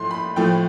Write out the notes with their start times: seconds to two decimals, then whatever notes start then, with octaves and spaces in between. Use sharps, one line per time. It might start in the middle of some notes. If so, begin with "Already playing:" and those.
Already playing: A2 F3 A3 C6
0.11 B5
0.36 A2 F3 A3 G5